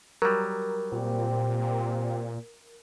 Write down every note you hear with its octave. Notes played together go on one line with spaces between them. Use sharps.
F#3 G3 A#4
A#2 C4 G4